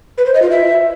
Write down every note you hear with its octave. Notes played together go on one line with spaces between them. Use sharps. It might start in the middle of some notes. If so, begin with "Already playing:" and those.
B4
C5
D#5
F4
E5